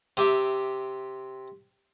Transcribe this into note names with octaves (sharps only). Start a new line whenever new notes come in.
C3 G4 E5